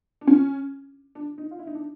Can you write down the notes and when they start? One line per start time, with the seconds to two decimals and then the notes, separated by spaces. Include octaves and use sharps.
0.21 D4
0.27 C#4
1.15 D4
1.38 D#4
1.51 F4
1.59 E4
1.67 D#4
1.75 D4